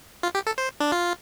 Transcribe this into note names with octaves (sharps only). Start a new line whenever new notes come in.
F4
G4
A4
C5
D4
F4